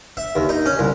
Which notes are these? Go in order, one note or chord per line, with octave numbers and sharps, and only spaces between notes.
E5
D#2
D#4
C#4
C2